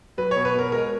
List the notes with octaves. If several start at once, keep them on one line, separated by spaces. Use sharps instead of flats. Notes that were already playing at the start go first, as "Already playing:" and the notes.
F#3 B4
C#5
B2
B4
B2 A#4
G#3 A#4